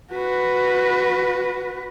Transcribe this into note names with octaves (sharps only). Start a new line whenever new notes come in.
F#4 B4